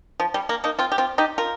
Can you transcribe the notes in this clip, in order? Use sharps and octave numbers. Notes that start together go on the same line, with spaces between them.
F3
G3
A#3
A#3 D#4
C4 F4
G4
C4 F4
D#4 G4
F4 A#4